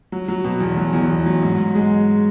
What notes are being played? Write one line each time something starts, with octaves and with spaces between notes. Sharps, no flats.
F#3
F#3
B2
E2
F#3
E2
E2
F#3
G#2
G#2
G#3